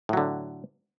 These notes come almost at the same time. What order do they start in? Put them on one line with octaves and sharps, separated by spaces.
A2 F#3 D3